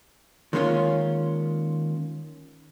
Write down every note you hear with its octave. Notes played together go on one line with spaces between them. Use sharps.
D#3 G#3 A#3 C#4 F4